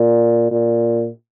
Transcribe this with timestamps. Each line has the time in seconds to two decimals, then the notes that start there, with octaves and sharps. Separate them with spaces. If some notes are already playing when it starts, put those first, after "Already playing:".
Already playing: A#2
0.51 A#2